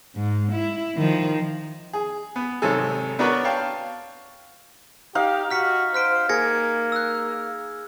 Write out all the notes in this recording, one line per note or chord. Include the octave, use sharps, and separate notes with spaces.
G#2
E4
D#3 F3
G#4
B3
G#1 C3 D#3 F#3 A4 G#5
B3 D4 F#4 A#4 B4 C#5
C#5 F5 G5 A5
D#4 G4 F5
F#4 F6 B6 C#7
C5 F6 B6 D7
A#3 G#4 G#6 A#6 C#7
E6 F#6